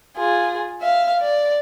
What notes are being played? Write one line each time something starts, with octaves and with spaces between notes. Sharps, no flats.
F4 G#4
E5 F5
D5